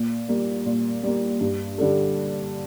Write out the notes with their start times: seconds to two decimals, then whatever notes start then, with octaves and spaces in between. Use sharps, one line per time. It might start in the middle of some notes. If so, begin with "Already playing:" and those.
Already playing: A#2
0.28 G3 A#3
0.66 A#2
1.03 G3 A#3
1.41 G2
1.78 D3 G3 D4 A4